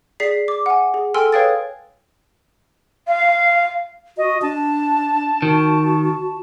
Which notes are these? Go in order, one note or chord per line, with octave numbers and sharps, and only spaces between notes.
G#4 D5 B6 C7
D6
F#5 G#5
G#4
A4 G5 G#5 C6 E6 F6
B4 C#5 F5 G5 D#6 A6
F5
F#4 D#5
D4 A5
D#3 F#4